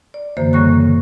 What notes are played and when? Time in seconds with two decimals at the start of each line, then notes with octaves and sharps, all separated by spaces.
0.14 D5
0.37 F#2 D3 E3 A#3 C5
0.53 A2 C#3 G3 A#3 C#6 F#6